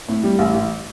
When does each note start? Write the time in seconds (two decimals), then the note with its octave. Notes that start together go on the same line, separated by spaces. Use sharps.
0.08 A2
0.23 G3
0.39 A1
0.54 A1